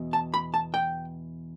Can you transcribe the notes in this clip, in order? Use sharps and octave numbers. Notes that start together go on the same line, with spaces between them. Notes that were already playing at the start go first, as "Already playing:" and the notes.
Already playing: E2 B2
A5
B5
A5
G5